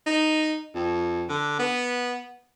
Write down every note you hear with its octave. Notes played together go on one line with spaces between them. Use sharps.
D#4
F2
D3
B3